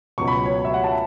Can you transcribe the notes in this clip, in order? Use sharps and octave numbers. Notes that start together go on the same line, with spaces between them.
C#2 B2 F#3 B3 C#6
B5
C#5
E5
F#5
A5